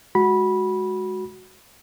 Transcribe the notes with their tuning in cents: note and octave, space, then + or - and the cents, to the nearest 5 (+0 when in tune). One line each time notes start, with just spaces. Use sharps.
G#3 +5 F#4 +0 B5 -15